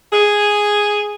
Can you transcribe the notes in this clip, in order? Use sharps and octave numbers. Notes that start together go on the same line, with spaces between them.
G#4